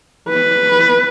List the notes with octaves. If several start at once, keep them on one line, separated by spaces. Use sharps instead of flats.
B4